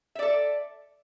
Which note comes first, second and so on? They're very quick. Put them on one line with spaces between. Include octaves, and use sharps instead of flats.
E5 D5 A4